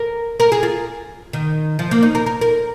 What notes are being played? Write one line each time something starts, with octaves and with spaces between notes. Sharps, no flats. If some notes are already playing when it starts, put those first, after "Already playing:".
Already playing: A#4
A#4
G#4
F4
D#3
F3
A#3
D#4
A#4
A#4
A#4